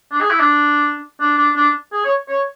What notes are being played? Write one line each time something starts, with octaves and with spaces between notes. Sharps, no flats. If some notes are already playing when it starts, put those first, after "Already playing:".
D4
G#4
E4
D4
D4
D4
D4
G#4
C#5
C#5